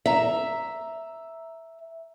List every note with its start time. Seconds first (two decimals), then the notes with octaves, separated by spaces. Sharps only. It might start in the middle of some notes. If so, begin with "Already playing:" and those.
0.06 E5 A#5